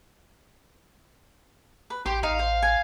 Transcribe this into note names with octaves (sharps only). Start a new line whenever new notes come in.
B4
A1 G4 C6
A1 D#4 F5
C5
G#5